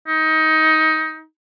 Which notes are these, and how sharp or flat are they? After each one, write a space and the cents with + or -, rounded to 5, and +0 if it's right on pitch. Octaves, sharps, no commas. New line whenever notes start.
D#4 +20